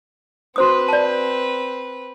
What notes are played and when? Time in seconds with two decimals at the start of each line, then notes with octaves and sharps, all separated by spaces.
0.56 C4 F#4 B4 C5 D#6
0.88 D5 A5